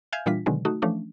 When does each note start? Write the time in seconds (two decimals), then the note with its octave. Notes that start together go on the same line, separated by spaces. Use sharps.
0.12 E5 F5 G#5 F6 G6 G#6
0.26 A#2 E3 G3 D4 F4 B6
0.46 B2 D3 D#3 F#3 G#3
0.65 A3 D#4 F#4
0.82 E3 F3 A3 C#4 D4